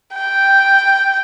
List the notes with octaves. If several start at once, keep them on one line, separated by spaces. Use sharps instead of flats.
G5